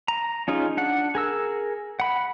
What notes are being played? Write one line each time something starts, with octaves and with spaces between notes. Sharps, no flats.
A#5
C#4 D#4 F4 G#4
D4 F#5
G#4 A#4 E6
F#5 B5